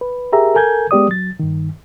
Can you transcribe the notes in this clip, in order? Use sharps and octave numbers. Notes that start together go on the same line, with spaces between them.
B4
G4 G#4 A#4 E5 A#5
A4 A#4 G#5 G6 G#6
G#3 B3 G4 D5 D#6
F#3 A6
G2 D#3